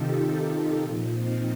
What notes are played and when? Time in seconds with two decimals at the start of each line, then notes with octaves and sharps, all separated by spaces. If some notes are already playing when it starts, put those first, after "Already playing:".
Already playing: C3 D#3 D#4 F4 G4 A4
0.19 D#4 G4
0.82 A#2 F3
1.13 C4 D#4